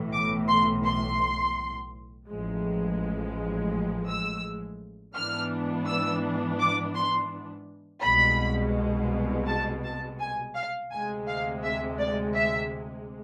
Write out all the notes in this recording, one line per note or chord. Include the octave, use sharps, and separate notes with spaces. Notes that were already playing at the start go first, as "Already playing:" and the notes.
Already playing: B1 A2 E3
D6
C6
C6
A1 A2 F3 G#3
E6
G#2 E3 B3 D4 F6
E6
D6
C6
C2 B2 G#3 B5
A5
A5
G#5
F5
D2 C3 G#3 G#5
F5
E5
D5
E5